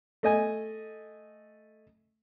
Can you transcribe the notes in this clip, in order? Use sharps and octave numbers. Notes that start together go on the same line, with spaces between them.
A3 D#5 G#5